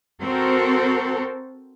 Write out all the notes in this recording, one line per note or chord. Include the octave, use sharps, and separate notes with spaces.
C4 F#4 A4 A#4 C5